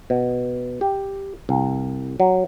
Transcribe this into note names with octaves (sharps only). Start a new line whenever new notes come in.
B2
G4
C2
F#3